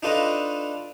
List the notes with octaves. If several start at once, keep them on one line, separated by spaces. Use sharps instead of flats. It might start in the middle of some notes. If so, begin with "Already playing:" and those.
D4 D#4 F4 A4 B4 D#5